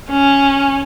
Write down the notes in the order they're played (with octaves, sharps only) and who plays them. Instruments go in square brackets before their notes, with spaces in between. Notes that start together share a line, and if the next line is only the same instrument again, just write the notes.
[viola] C#4